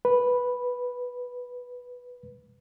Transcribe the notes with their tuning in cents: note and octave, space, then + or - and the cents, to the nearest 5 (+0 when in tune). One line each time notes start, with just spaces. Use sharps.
B4 -5